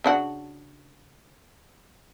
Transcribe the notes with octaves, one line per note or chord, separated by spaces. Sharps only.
C#3 D4 F#4